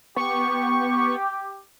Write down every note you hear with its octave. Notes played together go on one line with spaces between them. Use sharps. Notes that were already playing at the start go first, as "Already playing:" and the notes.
B3 G4 C#6